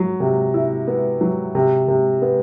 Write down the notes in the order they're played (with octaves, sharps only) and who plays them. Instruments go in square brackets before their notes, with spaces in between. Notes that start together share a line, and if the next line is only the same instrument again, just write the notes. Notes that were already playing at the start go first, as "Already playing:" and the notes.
Already playing: [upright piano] F#3
C3
E4
B3
F#3
C3
C3
B3